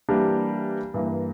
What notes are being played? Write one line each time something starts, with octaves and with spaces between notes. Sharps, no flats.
E3 G3 A#3 D4 G4
G2 E3 A#3